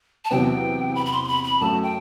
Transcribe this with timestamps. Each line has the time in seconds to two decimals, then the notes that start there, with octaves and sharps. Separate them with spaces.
0.25 A5
0.31 E2 C3 F#3 B3 G5
0.95 B5
1.06 B5
1.12 C6
1.24 C6
1.28 B5
1.44 B5
1.60 F#2 F#3 A3 A5
1.83 G5